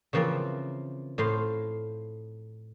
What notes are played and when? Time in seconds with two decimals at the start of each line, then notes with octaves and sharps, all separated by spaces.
0.13 C#3 E3 F3 A#3 C4
1.18 A2 C5 F5 C6